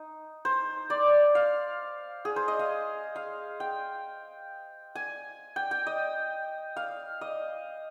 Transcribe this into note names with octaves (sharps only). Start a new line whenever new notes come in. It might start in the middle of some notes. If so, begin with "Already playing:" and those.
Already playing: D#4
C5
D5
F5
G#4
C5
D#5
F5
F5
G5
G#5
G5
G5
D#5
F5
D#5